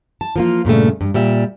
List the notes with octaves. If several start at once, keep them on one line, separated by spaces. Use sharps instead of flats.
A5
F3 A#3 F4
G2 A#2 C#3 A3
G2
A#2 G3 E5